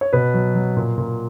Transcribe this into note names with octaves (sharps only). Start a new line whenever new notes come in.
C#5
B2 B4
F#3
F#3
A#2
A#2